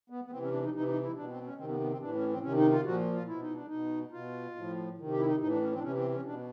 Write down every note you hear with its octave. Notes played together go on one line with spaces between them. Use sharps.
B3
B3
E3 C4
C3
C#4
D4
D#4
C3 E3 D#4
D#4
E4
B2 D4
C4
C#4
C3 D#3 C4
B3
B3
C4
A2 E3 D4
C#4
C4
C3 D#3 C#4
D#4
F4
A#2 F3 F#4
F4
B2 E4
D#4
D4
B2 D#4
B2 F4
A2 F3
C3 D#3
G4
E4
D#4
A2 E3 D#4
D4
C#4
C4
D4
C3 E3 C#4
C4
C#4
B2 D4